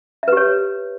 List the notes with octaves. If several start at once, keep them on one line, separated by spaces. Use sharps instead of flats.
G4 B4 C#5 E5